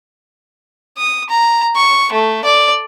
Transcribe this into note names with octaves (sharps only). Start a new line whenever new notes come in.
D#6
A#5
C#6
A3
D5